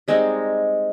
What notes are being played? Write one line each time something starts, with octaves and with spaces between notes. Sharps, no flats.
G3 G#3 C4 D#4